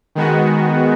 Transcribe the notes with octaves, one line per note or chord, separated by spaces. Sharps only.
D#3 G#3 B3 F#4